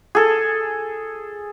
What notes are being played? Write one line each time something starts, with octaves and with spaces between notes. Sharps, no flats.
G#4 A4